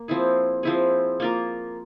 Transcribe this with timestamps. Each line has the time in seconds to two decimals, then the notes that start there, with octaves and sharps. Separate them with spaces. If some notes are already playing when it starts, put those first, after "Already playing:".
Already playing: A#3
0.08 F3 C4 E4 G#4
0.63 F3 C4 E4 G#4
1.20 A#3 F4 A#4